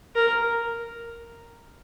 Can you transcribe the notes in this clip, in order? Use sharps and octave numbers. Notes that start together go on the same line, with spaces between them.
A#4